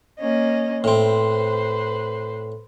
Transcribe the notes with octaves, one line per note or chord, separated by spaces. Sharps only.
A#3 C#4 D#5
A2 C4 B4 C5